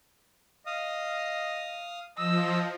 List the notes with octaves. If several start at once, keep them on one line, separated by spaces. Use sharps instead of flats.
D#5 F5 D#6
F3 D#5 E6